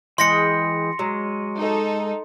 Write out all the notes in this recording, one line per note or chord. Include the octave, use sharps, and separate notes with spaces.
E3 G#3 G5 C6 A#6 C#7
F#3 G#3
D#4 A4